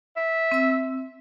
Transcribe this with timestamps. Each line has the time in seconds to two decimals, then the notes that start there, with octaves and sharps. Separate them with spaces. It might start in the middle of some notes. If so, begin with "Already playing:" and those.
0.17 E5
0.52 C4 E6